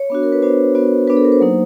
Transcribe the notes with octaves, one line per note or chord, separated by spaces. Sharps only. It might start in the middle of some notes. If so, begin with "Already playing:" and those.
Already playing: C#5
B3 D4 F#4
A#4
B4
B3 D4 F#4 C5
B3 D4 F#4
B3 D4 F#4 B4
A4
A#4
C5
F#3 A#3 D#4